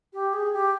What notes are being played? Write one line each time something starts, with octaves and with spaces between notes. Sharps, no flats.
G4
G#4
G4